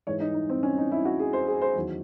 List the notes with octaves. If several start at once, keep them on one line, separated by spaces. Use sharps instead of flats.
G#2 E3 G#3 C#5
D#4
D#4
C4
C#4
D#4
E4
F#4
G#4
C5
G#4
C5
E2 D#3 F#3